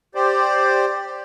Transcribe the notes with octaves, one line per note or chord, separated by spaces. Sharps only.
G4 C5 D5